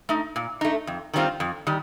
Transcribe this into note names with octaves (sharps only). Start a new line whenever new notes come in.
A3 D#4
A#2
A3 D#4
F2
D#3 G3 C4 F4
F2
D#3 G3